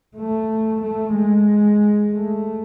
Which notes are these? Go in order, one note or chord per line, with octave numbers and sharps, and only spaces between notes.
A3
A3
G#3
A3